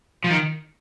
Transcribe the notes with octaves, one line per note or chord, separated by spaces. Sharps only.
F3
D#3